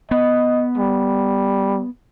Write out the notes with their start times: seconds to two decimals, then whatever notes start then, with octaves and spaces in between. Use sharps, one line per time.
0.11 B3 D#5
0.78 G3